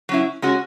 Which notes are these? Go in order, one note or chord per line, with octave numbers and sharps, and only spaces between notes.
F#3 C#4 E4
G#3 C#4 F#4